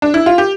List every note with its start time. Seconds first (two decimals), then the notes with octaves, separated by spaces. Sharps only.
0.02 D4
0.14 E4
0.26 F4
0.38 G4